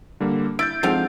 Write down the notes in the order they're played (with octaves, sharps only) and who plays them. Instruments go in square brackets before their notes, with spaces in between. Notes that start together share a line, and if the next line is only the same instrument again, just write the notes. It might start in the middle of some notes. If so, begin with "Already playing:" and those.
[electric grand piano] D3 G3 A#3
[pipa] E4 [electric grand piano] G6 A6 D7
[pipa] D3 C4 F5 [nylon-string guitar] F3 G#3 D#4